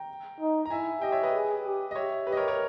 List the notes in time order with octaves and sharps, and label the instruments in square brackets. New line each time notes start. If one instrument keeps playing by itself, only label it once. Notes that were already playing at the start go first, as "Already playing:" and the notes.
Already playing: [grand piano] G5 A#5
[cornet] D#4
[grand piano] A#5
[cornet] E4 [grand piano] E5 G#5
[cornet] G4 [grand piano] D#5 G5
[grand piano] C#5 E5
B4 D#5
[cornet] G#4
G4
[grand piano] D#5
[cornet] G4 [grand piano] C#5 E5
[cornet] G4 [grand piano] B4
[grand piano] D#5
A#4 C#5
A#4 C#5